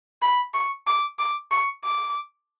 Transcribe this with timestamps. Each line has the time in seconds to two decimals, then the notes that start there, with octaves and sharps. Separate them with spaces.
0.22 B5
0.54 C#6
0.87 D6
1.19 D6
1.51 C#6
1.84 D6